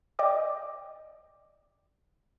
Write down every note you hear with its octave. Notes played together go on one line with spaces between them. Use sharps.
D5 D#5 G5 D6 D#6